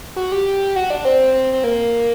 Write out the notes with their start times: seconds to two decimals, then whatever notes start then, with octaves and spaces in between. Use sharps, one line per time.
0.16 F#4
0.32 G4
0.76 F#4
0.90 D4
1.05 C4
1.34 C4
1.53 C4
1.64 A#3